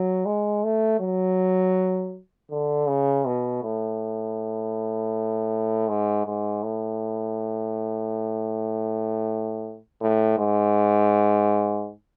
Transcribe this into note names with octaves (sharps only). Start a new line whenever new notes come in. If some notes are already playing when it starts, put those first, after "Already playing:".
Already playing: F#3
G#3
A3
F#3
D3
C#3
B2
A2
G#2
G#2
A2
A2
G#2